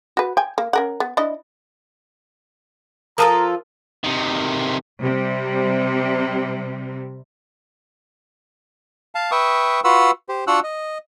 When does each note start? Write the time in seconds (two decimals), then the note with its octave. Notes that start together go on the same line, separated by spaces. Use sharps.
0.17 F#4 B4
0.37 G5 G#5
0.58 A#3
0.73 C#4 A#4 F#5
1.00 B3
1.17 D4 E4 D#5
3.18 F3 F4 A4 A#4 A5 A#5 D#6
4.04 C3 D#3
5.03 C3 G3
9.15 F5 A5
9.31 B4 E5 G5 C#6 D#6
9.84 F4 F#4 B4 F#5 C6 E6
10.29 G4 C5
10.47 D4 F4 F#4 F#5 E6 F#6
10.64 D#5